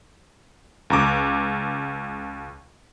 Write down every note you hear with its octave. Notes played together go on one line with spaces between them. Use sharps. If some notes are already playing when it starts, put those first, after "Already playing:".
C#2 A#5 D6